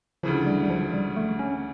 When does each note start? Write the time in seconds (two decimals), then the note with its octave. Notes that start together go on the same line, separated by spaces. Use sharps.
0.23 D2 C#3 E3 F3
0.46 G3
0.63 G3
0.70 F3
0.93 G3
1.17 A3
1.39 C#4